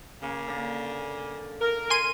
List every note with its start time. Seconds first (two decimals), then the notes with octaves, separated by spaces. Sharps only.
0.22 C#3 A#3
0.48 D3 A#3
1.61 A#4
1.90 G#5 C6 D#7